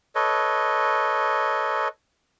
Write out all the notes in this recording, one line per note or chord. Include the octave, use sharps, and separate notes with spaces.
A4 B4 C#5 D#5